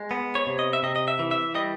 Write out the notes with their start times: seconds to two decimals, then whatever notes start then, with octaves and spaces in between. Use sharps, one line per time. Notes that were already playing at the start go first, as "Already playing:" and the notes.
Already playing: G#3
0.11 B3
0.35 C#5
0.47 C3
0.59 D#5
0.73 E5
0.83 C3 D#5
0.96 D#5
1.08 E5
1.19 E3
1.31 E5
1.55 G3 D#5